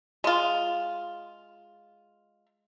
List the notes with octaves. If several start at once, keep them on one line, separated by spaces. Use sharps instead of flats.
G#3 F4